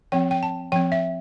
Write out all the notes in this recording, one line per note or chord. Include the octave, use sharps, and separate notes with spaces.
F3 C4 G5
G5
A5
F3 C4 G5
E5